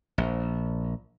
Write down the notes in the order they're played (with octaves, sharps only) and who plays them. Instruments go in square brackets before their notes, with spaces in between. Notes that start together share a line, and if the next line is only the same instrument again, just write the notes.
[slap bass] A#1